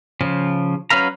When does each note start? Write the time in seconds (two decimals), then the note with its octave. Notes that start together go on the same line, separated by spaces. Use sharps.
0.21 C#3 F3
0.90 F#3 C#4 B4 F5 A#5